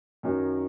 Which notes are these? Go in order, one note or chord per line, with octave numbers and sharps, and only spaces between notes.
F#2 D#3 F#3